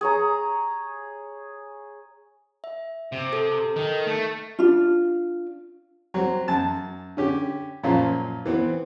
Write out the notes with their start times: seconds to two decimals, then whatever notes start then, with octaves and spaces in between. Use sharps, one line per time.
0.01 G#4 C#5 A#5
2.64 E5
3.12 C3
3.33 A4
3.76 D#3
4.07 A3
4.59 D4 F4
6.14 F#3 C4
6.48 F#2 A5
7.17 D3 C#4 G4
7.84 F#2 A#2 F3 C#4 F4
8.45 E3 B3 C4